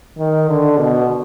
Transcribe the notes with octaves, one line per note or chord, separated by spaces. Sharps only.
D#3
D3
B2